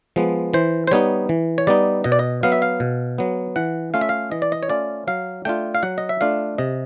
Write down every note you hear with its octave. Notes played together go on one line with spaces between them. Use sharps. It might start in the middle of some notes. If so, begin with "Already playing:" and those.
F3 G#3 B3
E3 C5
C5
G3 B3 D#4 C#5
E3
C#5
G3 B3 D#4 D5
B2 D#5
D5
D#5
F#3 B3 F5
E5
F5
B2
F#3 B3
E3 F#5
A3 C#4 F4 F5
E5
F5
E3 D#5
D5
D#5
C#5
A3 C#4 F4 D5
F#3 F5
A3 D4 F4 G5
F5
F#3 F#5
D#5
E5
A3 D4 F4 F5
C3 D#5